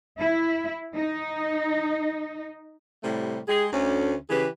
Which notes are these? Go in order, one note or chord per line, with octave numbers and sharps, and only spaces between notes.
E4
D#4
A2 C3 G3 A3
G#3 G4 G#4
D2 C#4
C#3 E3 G4 G#4 B4